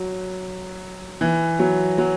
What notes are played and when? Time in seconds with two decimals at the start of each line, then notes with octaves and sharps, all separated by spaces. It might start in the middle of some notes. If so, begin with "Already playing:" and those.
Already playing: F#3
1.21 E3
1.59 F#3
1.98 F#3